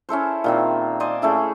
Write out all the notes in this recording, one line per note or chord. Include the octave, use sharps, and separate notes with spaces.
C#4 E4 A4 C5
A#2 D#3 C4
C5 D5 D#5 G#5
A3 C#4 E4 G#4